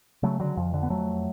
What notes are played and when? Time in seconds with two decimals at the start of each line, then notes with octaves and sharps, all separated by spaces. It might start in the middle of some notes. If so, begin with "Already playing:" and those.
0.23 C#3 F#3 A3
0.40 D3 F#3
0.57 F2 F3
0.74 D3
0.83 B3
0.90 F2 F#3 A3